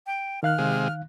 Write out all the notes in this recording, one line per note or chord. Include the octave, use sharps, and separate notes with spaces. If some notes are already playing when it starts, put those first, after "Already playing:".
G5
D#3 F5 F6 F#6
C3 G#3